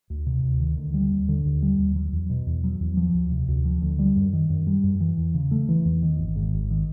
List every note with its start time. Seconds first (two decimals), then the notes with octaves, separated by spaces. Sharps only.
0.10 D2
0.26 C3
0.43 D2
0.60 D#3
0.77 D2
0.94 G3
1.11 D#2
1.29 D3
1.45 D#2
1.62 G3
1.79 D#2
1.96 F#3
2.13 E2
2.30 B2
2.47 E2
2.64 F#3
2.80 E2
2.97 F3
3.14 D2
3.31 C3
3.48 D2
3.65 F3
3.82 D2
3.99 G3
4.16 F#2
4.33 D#3
4.49 F#2
4.67 G3
4.83 F#2
5.00 E3
5.17 E2
5.34 C#3
5.51 A3
5.69 E3
5.85 E2
6.02 D#3
6.19 G#1
6.36 G#2
6.53 G#1
6.70 D#3